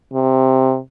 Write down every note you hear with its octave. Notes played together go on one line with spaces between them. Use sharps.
C3